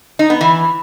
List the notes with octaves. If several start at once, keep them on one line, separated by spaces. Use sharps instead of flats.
D#4
B3
E3